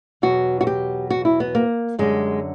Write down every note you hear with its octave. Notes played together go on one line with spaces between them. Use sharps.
E2 B2 F#3 F#4
F#4
G4
F#4
E4
B3
A#3
F#2 D3 G3 G#3